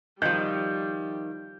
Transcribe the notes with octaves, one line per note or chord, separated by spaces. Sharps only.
D#3 F3 G3 G6